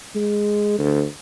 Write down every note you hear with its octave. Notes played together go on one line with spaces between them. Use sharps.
G#3
D2